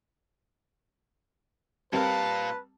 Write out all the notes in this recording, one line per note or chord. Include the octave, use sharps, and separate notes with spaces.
A#2 G3 C4 A#4 B4 F5 A5